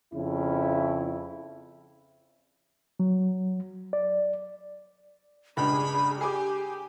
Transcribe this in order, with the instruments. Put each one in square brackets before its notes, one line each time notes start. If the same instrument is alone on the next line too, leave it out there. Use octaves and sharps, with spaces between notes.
[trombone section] F2 C#3 E4
[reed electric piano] F#3
D5
[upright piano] C#2 G2 [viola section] D4 G#4 [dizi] B5
[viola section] G4 [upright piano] G#4 D6 [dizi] G#5